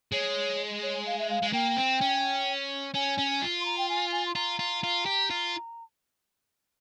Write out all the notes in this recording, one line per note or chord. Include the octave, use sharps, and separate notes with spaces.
G#3 C#5
C#5
F5
E5
F5
G#3
A#3 G5
C4
C#4
C#4 G#5
C#4
F4
C6
A#5
G5
G#5
G#5
C6
F4 A#5
F4
F4
G4
F4